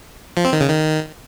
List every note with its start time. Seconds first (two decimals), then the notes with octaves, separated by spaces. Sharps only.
0.37 F3
0.45 C4
0.53 D#3
0.61 C#3
0.69 D#3